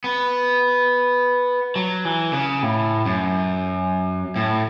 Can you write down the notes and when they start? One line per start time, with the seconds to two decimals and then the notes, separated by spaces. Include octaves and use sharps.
0.04 B3
1.76 F#3
2.05 E3
2.33 C#3
2.63 A2
3.06 F#2
4.36 A2